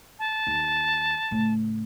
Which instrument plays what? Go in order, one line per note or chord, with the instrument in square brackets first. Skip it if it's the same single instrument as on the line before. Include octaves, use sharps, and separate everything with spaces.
[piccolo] A5
[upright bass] D#2
A2 C#3